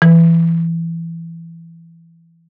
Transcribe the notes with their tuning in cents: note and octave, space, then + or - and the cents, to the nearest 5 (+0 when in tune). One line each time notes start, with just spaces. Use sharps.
E3 +15